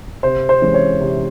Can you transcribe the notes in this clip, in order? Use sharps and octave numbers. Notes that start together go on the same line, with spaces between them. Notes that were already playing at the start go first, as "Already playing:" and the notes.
C3 C5
C5
E3 G#3 C#4
C#5
C3